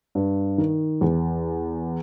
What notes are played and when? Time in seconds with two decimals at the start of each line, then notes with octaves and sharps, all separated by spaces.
0.15 G2
0.58 D#3
1.01 E2